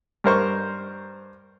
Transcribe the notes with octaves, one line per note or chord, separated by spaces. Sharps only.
G2 A#4 C5 C#6